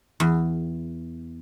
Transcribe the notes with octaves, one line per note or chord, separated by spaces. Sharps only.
E2